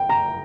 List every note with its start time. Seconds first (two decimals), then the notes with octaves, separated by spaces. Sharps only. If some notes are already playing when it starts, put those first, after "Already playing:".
Already playing: G5
0.09 A#5